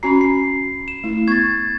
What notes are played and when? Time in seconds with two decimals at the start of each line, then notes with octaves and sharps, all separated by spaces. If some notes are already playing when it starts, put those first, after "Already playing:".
0.03 C#4 F#4 A#5 B5 C7
0.21 C7
0.88 E7
1.04 A3 E4
1.28 B3 C#6 G#6 A6